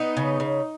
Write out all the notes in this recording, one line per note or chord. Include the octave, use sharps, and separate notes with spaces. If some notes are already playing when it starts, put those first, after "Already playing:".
Already playing: B3 D#4
C#3
C#3